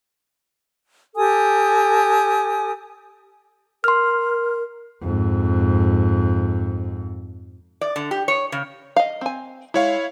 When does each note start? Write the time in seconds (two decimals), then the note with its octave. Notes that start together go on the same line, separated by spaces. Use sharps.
1.16 G4 A4 G#5 D#6
3.84 A#4 C6 F6
5.01 F2 G#2
7.81 D5
7.96 D3
8.11 G4
8.28 C#5
8.52 C#3
8.96 D#5 F5
9.21 C4 G#5
9.74 G#3 E4 C#5 F5